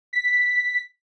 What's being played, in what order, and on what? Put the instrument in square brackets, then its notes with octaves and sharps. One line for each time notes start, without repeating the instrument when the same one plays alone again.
[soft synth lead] B6